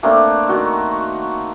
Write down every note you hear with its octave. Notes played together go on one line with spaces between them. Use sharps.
A3 A#3 C4 D4
D#3 F#4